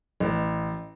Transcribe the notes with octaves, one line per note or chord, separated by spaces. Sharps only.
A1